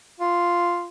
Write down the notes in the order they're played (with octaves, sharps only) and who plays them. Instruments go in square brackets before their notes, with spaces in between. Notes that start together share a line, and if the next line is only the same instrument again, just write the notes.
[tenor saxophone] F4